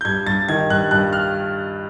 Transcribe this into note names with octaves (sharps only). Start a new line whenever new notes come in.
G6
G2 G#6
G2 A6
D#3 G#6
G2 F#6
G2 F#6
F6